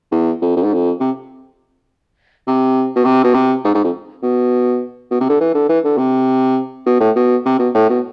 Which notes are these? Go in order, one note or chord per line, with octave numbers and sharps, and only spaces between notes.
E2
F2
F2
G#2
F2
C3
C3
B2
C3
B2
C3
G#2
G#2
F2
B2
B2
C3
D3
E3
D3
E3
D3
C3
B2
A2
B2
C3
B2
A2
B2